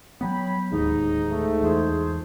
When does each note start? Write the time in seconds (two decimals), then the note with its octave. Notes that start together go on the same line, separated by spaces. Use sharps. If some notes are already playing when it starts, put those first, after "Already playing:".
0.21 F#3 G3 B3 C#5 G5 B5
0.72 D1 D#2 G#2 D#4
1.31 A3
1.62 E2 F4 G#4 C5